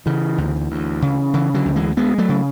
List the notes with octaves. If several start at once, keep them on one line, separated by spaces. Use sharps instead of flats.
C#3 E3
D2
D2
C#3
C#3 E3
D3 F#3
D2
E3 G#3
D2 G#3 B3
F#3 A3
C#3